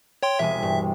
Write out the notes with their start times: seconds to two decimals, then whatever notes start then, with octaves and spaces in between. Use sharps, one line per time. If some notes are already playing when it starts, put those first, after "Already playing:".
0.23 C#5 G5 C6
0.39 E1 C2 E5 G#5
0.63 G2